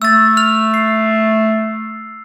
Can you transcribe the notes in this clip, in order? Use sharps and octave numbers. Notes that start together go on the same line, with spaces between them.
A3 E6 A6
F6 F7
C7